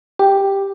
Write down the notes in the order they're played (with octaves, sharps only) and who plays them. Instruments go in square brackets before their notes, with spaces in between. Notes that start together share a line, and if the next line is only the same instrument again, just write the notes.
[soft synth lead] G4